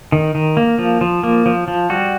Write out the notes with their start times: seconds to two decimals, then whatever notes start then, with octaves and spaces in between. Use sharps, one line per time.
0.12 D#3
0.35 D#3
0.57 A#3
0.79 F3
1.01 F3
1.23 A#3
1.46 F3
1.68 F3
1.90 G3 F#4